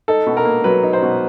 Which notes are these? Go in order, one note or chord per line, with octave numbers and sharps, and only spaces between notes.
D#4 A4
B2
A#4
A#3
F#3 B4
D#4
C5
B2